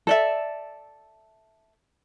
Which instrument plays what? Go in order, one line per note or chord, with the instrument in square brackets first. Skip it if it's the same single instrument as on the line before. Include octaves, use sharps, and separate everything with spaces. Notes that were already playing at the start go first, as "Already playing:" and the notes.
[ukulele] A4 D5 E5